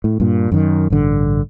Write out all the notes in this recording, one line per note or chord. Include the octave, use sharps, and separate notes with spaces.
A2
G2 A#2
F#2 D#3
A1 G2 D3